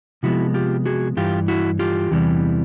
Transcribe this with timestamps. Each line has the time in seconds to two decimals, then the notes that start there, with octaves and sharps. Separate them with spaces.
0.23 C3 F3 G#3 B3 E4 F#4
0.54 F4 G4
0.86 F#4 G#4
1.17 G2 E3 F4 G4
1.48 E4 F#4
1.79 F4 G4
2.11 E2 C3 E3 G3